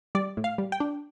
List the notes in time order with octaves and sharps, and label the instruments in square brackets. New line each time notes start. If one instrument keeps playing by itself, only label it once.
[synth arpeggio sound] G3 D5
A2
F5
G3
G5
D4